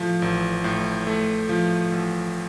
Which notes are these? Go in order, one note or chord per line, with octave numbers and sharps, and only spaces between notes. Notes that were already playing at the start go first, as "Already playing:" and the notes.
Already playing: A2 F3 A3
A1
A2
A3
F3
A1